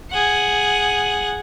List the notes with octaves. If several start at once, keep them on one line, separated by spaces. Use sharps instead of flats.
G#4 F#5